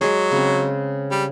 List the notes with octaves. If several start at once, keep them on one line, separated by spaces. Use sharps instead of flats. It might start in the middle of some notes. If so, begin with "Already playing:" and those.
F#3 G#3 G#4
C#3 C4
G3